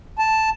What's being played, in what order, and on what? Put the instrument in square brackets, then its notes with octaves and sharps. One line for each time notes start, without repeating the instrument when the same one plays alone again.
[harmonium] A5